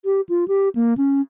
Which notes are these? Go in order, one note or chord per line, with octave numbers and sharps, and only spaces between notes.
G4
F4
G4
A#3
C#4